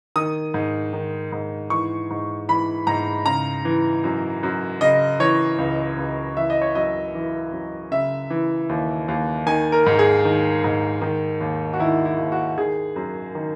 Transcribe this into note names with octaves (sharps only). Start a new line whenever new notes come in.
D#3 D#6
G#2
D#3
G#2
E3 C#6
G#2
E3 B5
G#2 A#5
C#3 A#5
E3
F#2
F#2
C#3 D#5
E3 C#5
C#2
C#2
E3 E5
D#5
C#5
F#2 D#5
E3
F#2
C#3 E5
E3
D#2
D#2
D#3 G#5
A#4
G#2
G#4
D#3
G#2
D#3
D#2
F#4
D#3 E4
E4
D#2
F#4
D#3 G#4
F#2
D#3